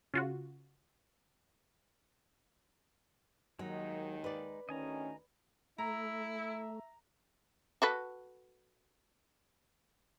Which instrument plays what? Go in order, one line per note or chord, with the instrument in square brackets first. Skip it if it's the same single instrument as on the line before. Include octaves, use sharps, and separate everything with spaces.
[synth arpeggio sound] C#3 F4 F#4
[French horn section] D#2 D#3 [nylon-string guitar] F#3 [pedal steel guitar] G#3 D#4
[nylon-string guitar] B4 D5
[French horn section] D2 D#3 [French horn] C#4 [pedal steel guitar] D#5 G#5 A#5
[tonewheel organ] A3 [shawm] E4 [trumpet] E5 [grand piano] A#5
[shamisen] F#4 A4 B4